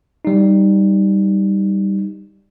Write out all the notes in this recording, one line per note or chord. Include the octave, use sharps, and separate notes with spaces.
G3 D#4